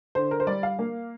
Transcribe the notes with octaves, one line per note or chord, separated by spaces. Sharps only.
D3 C5
A#4
C5
G3 D5
F5
A#3